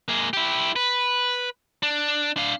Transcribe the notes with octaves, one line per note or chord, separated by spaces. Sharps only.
A#3 G#4
E4 G4
B4
D4
D4 F5